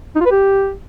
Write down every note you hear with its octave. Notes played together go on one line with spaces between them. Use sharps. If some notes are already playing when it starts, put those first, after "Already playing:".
D#4
F4
B4
G4